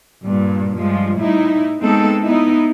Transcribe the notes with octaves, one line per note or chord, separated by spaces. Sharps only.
G2 A#2
G2 F3 G#3
A2 G3 D#4 E4
G#3 A3 B3 C4 D#4 A4
B3 D#4 E4